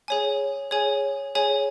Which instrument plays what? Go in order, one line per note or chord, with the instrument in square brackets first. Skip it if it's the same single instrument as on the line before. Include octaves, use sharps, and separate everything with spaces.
[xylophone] G#4 C#5 G#5
G#4 C#5 G#5
G#4 C#5 G#5